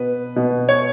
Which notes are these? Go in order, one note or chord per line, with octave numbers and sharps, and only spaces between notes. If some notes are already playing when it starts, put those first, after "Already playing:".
Already playing: B2 B3 B4
B2 B3
C#5